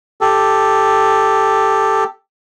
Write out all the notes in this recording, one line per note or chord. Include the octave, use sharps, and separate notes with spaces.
G4 A4